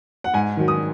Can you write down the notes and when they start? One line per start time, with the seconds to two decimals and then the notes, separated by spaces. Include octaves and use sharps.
0.24 F#5
0.34 G#2 G#5
0.57 D#3 F#3
0.68 D#6